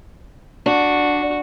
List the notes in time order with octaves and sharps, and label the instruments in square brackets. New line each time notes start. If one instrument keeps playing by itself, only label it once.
[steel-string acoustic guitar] D4 [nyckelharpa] F#4